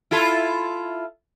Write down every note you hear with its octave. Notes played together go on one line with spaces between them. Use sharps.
E4 F4 A4